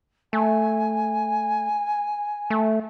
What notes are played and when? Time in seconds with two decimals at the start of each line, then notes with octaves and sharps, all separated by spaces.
0.33 A3 G#5
2.50 A3